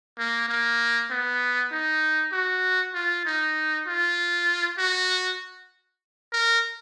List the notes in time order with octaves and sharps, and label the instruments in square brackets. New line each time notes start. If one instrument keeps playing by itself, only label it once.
[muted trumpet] A#3
A#3
B3
D#4
F#4
F4
D#4
F4
F#4
A#4